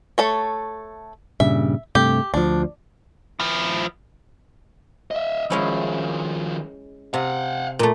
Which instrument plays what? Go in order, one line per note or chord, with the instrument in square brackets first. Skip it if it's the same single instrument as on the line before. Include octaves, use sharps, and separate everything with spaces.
[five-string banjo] A3 A4 C#5
[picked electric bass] G2 A#2 C#3 [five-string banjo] E5
[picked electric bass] G2 C3 A3 [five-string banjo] G4
[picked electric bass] D2 F3 [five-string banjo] D4
[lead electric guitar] F3 E4
D#5 E5
[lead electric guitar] D#3 F3 [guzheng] G#3 C#4 E4
[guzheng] C3 [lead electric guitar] F5 F#5
[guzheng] A#2 A3